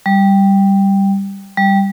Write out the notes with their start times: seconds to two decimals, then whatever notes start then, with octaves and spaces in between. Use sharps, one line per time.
0.06 G3
1.57 G3